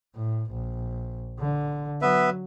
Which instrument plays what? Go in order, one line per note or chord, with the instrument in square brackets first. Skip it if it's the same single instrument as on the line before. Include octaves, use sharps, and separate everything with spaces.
[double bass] A2
A#1
D3
[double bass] F#3 [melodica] B3 B4 E5